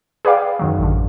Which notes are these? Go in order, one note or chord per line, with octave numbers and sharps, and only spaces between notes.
G#4 B4 D5 F5 G5
F#2 D#3 F#3
A1 D3